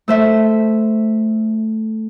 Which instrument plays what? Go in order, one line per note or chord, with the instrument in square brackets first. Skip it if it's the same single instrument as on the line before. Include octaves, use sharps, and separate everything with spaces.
[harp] A3 [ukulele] A4 C5 E5